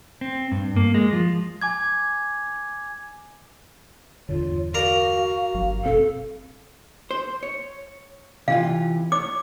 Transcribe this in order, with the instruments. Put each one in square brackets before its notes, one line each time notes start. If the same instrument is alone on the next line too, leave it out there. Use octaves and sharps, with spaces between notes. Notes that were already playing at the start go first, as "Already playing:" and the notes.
[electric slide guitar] C4
G2
A#3
G#3
F3
[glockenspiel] G#5 D6 G#6
[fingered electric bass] E2 G2 D3 [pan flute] F4 [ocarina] C#5
[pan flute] F#4 [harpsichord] A#4 D5 A#5 [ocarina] F5
[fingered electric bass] G1 F#3
[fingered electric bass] F#1 B2 C4 [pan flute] A4
[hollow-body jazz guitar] C5
C#5
[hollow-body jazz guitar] C3 E3 F4 [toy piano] F5
[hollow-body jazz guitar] C#5 [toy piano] D6